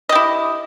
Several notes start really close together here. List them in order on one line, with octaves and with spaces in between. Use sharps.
D#5 G4 E4